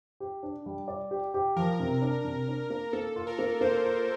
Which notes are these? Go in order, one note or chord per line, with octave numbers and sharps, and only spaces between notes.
G4
D4
G3
D5
G4
G4
F3 A#4
C3
D4
C3
D4
A#3
A#3 A4
F4
A#4
A#3
A#3 C5
F4